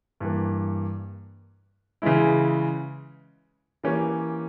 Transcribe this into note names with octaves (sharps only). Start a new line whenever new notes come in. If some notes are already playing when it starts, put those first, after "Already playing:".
G2 E3 A#3
C#3 E3 G#3 E4
E3 A#3 C#4 G4